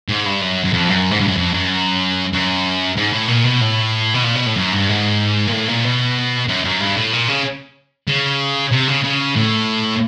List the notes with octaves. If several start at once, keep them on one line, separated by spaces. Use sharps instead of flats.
G#2
G2
F#2
F#2
F2
F#2
G#2
G2
F#2
F2
F#2
F#2
G#2
A2
A#2
B2
A2
B2
A#2
B2
A2
F#2
G2
G#2
A#2
A2
A#2
B2
F#2
F#2
G2
A2
A#2
C#3
C#3
C3
C#3
C#3
A2